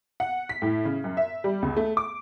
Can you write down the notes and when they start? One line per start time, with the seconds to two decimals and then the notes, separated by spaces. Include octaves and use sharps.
0.20 F#5
0.49 B6
0.62 A2
0.85 C#3
1.04 F#2
1.17 E5
1.44 G3
1.62 C#2
1.77 A3
1.97 D6